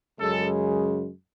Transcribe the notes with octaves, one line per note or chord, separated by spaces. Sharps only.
F#2 C#3 G#3 A4